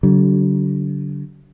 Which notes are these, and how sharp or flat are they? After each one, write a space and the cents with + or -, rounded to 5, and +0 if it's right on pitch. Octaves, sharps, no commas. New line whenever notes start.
D3 -35 F#3 +30